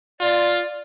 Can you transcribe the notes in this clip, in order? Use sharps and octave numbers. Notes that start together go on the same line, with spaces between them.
F4 D5